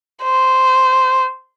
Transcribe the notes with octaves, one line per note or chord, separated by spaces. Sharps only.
C5